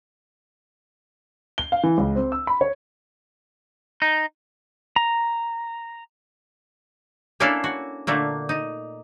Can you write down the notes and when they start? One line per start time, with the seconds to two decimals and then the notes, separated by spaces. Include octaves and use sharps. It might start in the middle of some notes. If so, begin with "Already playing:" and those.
1.58 G7
1.72 F5
1.84 E3
1.98 C#2
2.16 C4
2.32 E6
2.47 B5
2.61 C#5
4.02 D#4
4.96 A#5
7.40 A#3 C#4 D4 E4 A4 F5
7.64 F#4
8.07 A#2 D3 A3 A#3
8.49 D#4